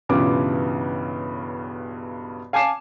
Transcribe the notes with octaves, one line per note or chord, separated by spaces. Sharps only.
B1 G2 C#3 E3 F4 D6
F5 G#5 A5 D6 C7 E7